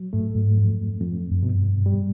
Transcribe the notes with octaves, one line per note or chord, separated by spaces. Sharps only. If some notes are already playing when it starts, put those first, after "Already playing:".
Already playing: F#3
G#2 A3
G#2
F2
F2
F#2
G2 B2
G3